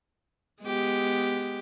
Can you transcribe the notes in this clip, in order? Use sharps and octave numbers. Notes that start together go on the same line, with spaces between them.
G#3 B3 G4